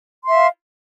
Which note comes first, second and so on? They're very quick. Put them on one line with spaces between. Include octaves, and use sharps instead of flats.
C6 E5 F5